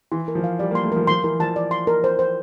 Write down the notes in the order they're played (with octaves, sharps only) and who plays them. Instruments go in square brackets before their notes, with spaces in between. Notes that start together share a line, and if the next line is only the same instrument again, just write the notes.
[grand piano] E3 [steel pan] C6
[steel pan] A#4
[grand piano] F3
[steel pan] F5
[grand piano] G3 [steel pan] D5
[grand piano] A#3
[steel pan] C6
[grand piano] A3
[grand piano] F3 [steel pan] A#4
[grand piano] F3 [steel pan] C6
[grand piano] E3 [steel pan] A#4
[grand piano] F3 [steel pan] A5
[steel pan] D5
C6
A#4
C5
C5